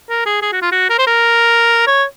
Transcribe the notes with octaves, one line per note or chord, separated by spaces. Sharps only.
A#4
G#4
G#4
F#4
F4
F#4
A#4
C5
A#4
C#5